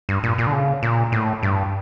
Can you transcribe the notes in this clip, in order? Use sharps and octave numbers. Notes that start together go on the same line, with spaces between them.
G2
A#2
A#2
D3
C#3
A#2
A2
G2